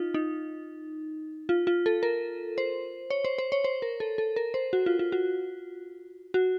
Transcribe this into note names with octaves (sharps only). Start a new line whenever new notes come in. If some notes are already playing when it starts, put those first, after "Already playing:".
Already playing: D#4 F4
D#4
F4
F4
A4
A#4
C5
C#5
C5
C5
C#5
C5
A#4
A4
A4
A#4
C5
F#4
F4
F4
F#4
F#4